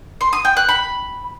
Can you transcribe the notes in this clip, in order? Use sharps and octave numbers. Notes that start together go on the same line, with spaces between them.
C6
D#6
G5
F#6
B5